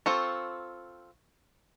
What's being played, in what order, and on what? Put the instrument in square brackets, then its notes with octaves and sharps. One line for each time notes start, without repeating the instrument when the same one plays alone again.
[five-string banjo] C4 F4 A4 [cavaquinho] C#6